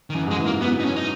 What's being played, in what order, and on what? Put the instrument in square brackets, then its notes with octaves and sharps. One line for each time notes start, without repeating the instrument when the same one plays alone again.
[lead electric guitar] D#3
[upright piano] F#2 [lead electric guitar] E3
[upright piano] G#2 [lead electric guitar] G#3
[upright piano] E3
[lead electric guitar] A#3
[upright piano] F#3
[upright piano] E3 [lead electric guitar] B3
[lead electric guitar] D#4
C#4
D#4